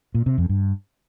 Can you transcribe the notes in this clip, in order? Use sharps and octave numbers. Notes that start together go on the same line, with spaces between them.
A#2
C3
F2
G2